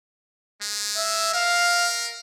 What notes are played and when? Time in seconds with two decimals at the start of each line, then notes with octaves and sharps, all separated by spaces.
0.62 G#3
0.97 E5
1.34 A#4 F5